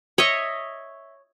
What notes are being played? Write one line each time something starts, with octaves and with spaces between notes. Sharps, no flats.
C#5 D#5 E5 C#6